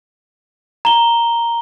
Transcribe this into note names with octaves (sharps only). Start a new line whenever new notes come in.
A#5 G7